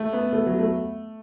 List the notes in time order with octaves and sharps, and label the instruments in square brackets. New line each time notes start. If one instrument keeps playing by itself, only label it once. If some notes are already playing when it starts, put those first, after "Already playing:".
Already playing: [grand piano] A3
B3
A3
F#3
A3